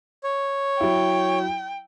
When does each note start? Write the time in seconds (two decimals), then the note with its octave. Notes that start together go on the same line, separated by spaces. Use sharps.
0.24 C#5
0.80 F#3 E4 G5